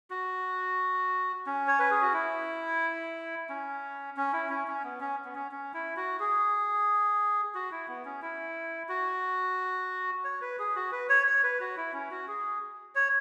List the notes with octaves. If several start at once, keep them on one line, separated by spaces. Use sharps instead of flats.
F#4
C#4
C#5
B4
G#4
F#4
E4
C#4
C#4
E4
C#4
C#4
B3
C#4
B3
C#4
C#4
E4
F#4
G#4
F#4
E4
B3
C#4
E4
F#4
C#5
B4
G#4
F#4
B4
C#5
C#5
B4
F#4
E4
C#4
F#4
G#4
C#5